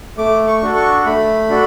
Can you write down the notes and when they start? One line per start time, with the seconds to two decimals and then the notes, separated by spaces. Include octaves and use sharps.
0.18 A3 D6
0.47 C#6
0.62 D4 F#4 A4
0.76 C#6
1.05 A3 B5
1.49 D4 F#4 A4